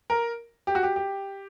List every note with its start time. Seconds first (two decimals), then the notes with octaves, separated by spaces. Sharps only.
0.10 A#4
0.67 G4
0.75 F#4
0.83 G4
0.96 G4